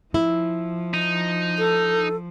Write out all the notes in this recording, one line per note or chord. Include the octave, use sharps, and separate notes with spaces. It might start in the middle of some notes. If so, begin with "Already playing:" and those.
F3 E4
D#4
A4